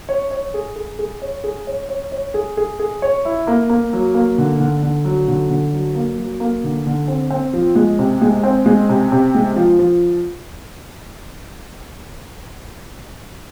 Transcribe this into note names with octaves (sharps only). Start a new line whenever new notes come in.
C#5
C#5
G#4
G#4
G#4
C#5
G#4
C#5
C#5
C#5
G#4
G#4
G#4
C#5
E4
A#3
A#3
F#3
A#3
D3
D3
D3
F#3
D3
D3
F#3
A#3
F#3
A#3
D3
D3
C4
C4
F3
G#3
C3
G#3
C4
G#3
C3
C3
G#3
F3
F3